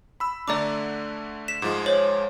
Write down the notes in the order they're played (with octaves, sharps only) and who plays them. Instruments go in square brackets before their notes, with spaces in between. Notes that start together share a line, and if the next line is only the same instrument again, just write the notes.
[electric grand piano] B5 E6
[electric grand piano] D3 A3 D4 [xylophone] D5 A#5 D6
[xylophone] B6 E7
[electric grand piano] G#2 F3 G#3
[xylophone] C5 C#5 F#7